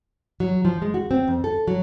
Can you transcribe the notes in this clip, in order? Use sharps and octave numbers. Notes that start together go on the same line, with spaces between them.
F#3
F3
G#3
F#4
C4
F2
A4
F#3